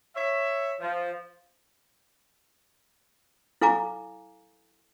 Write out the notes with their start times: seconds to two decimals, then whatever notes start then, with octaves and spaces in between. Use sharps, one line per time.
0.16 C#5 E5
0.80 F3
3.61 E4 A4 F5 G#5 A#5 D6